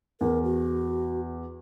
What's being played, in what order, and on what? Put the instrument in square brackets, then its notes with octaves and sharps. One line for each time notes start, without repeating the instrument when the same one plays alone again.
[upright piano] E2 [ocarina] A#4
[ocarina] F#4